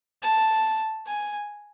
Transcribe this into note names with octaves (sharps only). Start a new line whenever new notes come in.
A5
G#5